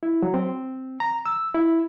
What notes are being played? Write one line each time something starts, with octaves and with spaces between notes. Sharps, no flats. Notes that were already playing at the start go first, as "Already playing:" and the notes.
E4
F#3
C4
A#5
E6
E4